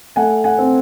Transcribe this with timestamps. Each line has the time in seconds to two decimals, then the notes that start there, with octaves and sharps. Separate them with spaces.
0.16 A3 F#5 G#5
0.44 F#5 G#5
0.58 C4